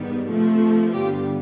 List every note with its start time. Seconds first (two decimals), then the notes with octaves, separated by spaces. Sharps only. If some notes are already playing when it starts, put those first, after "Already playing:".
Already playing: G#2 D#3 G3 B3
0.27 C3 F3 A3
0.93 G2 D3 G3 B3 F4 G4